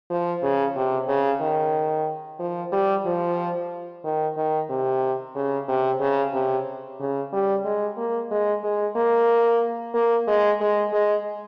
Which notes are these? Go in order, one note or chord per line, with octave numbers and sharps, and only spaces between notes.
F3
C#3
C3
C#3
D#3
F3
G3
F3
D#3
D#3
C3
C#3
C3
C#3
C3
C#3
G3
G#3
A#3
G#3
G#3
A#3
A#3
G#3
G#3
G#3